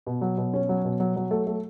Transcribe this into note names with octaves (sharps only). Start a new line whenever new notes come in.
B2
F#3
B2
C#4
F#3
B2
F#3
F#3
A3
A3